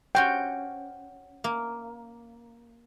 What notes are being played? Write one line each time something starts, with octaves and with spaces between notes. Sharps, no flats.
C#4 F#4 C5 G5
A#3